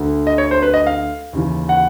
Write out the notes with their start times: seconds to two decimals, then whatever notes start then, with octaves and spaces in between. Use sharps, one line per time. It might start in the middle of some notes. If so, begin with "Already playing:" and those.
Already playing: D2 D3
0.27 D#5
0.38 C#5
0.51 C5
0.62 B4
0.74 D#5
0.87 F5
1.33 D#2 C#3 E3
1.69 F#5